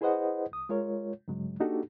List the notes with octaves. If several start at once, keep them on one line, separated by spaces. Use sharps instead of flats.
E4 G#4 B4 C5 D#5 F#5
C2 D#6
G#3 F4 A#4 C#5
G2 C#3 F#3 G#3
A#3 D4 D#4 F#4 G4 A4